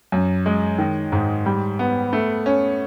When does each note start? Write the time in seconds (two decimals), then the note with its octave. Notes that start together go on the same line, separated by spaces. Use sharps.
0.12 F#2
0.46 G#3
0.78 D#3
1.12 G#2
1.46 G3
1.79 B3
2.13 A3
2.46 C#4